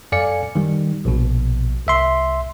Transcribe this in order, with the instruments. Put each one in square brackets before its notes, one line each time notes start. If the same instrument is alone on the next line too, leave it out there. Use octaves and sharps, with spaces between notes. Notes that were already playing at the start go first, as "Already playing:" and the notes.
[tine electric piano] F#2 A4 D5 F5 G#5 C#7
D#3 G3
A#1 B2
C2 E5 C6